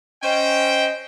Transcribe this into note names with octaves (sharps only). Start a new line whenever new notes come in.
C#4 C5 D#5 G5